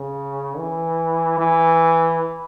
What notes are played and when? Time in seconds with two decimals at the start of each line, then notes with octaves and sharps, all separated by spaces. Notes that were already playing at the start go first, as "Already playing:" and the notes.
Already playing: C#3
0.57 E3
1.38 E3